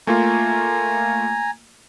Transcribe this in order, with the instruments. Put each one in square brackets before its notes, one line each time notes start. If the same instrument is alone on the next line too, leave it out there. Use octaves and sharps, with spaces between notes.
[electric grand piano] A3 A#3 F4 [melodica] G#5 A#5